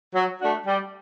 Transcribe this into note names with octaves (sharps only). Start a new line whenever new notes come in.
F#3
A3 D4 F#4
G3